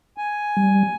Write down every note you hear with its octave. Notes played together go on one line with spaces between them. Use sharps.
G#5
G3